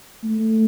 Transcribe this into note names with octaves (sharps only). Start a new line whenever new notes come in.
A3